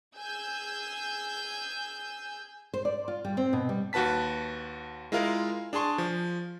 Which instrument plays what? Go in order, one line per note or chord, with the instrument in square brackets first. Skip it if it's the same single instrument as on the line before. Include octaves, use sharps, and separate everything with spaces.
[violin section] G#4 G#5 E6 G6
[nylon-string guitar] C5
D5
F4
G3
C4
B2
G3
[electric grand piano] D#2 F#4 B4 A5 B6
G#3 E4 F4 A#4 F5
D4 G#4 A5 C6 C#6
F3